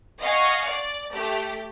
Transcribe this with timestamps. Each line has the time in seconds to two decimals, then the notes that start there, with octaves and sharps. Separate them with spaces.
0.20 D#5 F5 F#5 G#5 C#6
0.67 D5
1.13 A3 G4